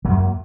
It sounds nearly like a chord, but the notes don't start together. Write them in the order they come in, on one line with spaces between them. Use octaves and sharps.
F#3 F#2 A#3